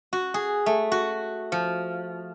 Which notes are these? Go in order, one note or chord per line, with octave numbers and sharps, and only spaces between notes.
F#4
G#4
A3
F#4
F3